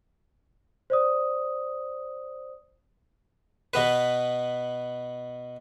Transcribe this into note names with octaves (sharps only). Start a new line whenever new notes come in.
C5 D5 D#6
B2 B3 B4